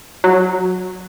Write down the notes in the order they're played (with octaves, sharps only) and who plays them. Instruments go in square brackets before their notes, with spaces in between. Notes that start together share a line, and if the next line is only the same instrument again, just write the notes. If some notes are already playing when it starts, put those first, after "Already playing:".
[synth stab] F#3